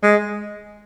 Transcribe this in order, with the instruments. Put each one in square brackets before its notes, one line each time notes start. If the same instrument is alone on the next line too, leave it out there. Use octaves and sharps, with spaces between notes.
[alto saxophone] G#3